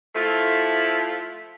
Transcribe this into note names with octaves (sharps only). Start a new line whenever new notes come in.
F3 A3 E4 F4